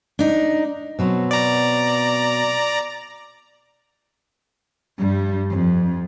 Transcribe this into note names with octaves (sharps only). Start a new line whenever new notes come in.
D4 D#4
B2 F#3 C4
D5 A#5
G2 G3
F2